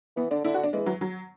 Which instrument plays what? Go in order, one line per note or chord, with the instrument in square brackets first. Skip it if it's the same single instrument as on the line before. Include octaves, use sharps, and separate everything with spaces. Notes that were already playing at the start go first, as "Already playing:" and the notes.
[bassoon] E3 [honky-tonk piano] B3
[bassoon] D3 [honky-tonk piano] D4
[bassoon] D3 [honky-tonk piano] E4
[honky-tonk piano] F#4
D4
[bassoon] E3 [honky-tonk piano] G#3
[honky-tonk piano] F#3
F#3